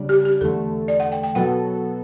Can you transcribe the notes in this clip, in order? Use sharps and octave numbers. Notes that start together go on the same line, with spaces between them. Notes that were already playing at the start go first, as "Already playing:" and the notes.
Already playing: C#3 G3 D4
G4
G4
E2 D3 A3 A4
D5
F#5
G5
G5
B2 F#3 B3 F#4 A4 F#5